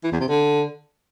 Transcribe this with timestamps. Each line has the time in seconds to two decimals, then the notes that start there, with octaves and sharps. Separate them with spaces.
0.04 E3
0.12 E2
0.20 C3
0.28 D3